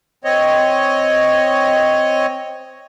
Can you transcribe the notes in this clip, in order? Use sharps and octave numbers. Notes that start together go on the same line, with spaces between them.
C4 C#5 D#5